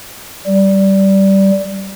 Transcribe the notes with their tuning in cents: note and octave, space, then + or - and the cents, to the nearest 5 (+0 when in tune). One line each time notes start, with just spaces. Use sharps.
G3 -15